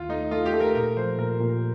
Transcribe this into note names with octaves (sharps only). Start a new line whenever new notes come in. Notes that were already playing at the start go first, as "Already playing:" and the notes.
Already playing: D#2 F4
A3 D#4
A3 F4
G4
A3
A#4
A#2 A#4
F3 C5
A#2 A#4
A#2